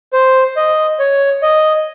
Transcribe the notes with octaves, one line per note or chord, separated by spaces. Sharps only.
C5
D#5
C#5
D#5